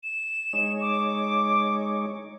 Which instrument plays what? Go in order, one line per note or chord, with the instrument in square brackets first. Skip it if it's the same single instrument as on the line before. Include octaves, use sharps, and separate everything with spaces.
[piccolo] E7
[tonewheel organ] G#3 D#4 C#5
[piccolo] D6